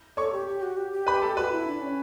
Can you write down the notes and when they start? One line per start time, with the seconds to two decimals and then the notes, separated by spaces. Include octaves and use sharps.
0.17 A4 C#5 C#6
0.33 G4
0.48 G4
0.63 F#4
0.77 G4
0.92 G4
1.07 B4 B5
1.16 G5
1.22 A4 A5
1.37 F#4 B4 B5
1.52 E4
1.67 D4
1.82 C#4